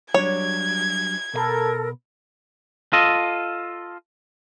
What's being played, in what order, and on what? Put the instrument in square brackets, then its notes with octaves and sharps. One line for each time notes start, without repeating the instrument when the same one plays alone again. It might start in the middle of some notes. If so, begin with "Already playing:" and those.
[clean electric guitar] F#3 G3 D4 [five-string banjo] C#5 [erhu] G#6
[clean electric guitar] B2 D#5 B5 [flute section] A4 A#4
[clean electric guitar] F4 A4 D#5